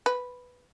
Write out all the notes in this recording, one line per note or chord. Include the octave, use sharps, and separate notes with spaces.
B4